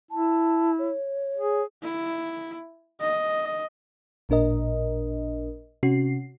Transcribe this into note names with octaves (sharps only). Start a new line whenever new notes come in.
E4 A5
C#5
G#4
E4
D#5
A1 A#2 D4 A#4 D#5
C3 C#4 F#4 C7